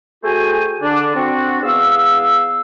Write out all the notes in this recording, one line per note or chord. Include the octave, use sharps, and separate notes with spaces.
A3 F#4 G#4 C5 G5 G#5
D3 D4
C4 D4 F#4
E2 B3 F5 E6